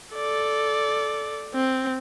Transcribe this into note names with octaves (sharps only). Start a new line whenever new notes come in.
A4 D5
C4